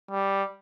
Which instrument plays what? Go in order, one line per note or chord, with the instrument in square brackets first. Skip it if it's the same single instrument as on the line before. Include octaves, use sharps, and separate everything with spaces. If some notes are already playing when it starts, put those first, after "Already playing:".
[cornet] G3